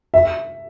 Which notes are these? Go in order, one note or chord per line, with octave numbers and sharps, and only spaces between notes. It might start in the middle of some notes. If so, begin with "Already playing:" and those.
E5